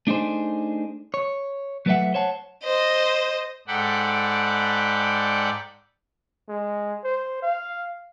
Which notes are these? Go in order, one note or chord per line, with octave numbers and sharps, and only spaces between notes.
A3 D4 D#4 G#4 C5
C#5
F#3 A3 B4 C#5 E5 F#5
C5 C#5 F#5 A5
C5 D#5
G#2 A4 D5 F#5 G5 B5
G#3
C5
F5